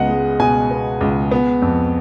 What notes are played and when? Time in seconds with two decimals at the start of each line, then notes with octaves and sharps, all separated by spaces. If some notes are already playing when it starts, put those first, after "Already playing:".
Already playing: C#2 B3 D#5 F#5
0.09 G#3
0.39 B2 G#5
0.71 B3
1.01 C#2
1.31 B3
1.62 F2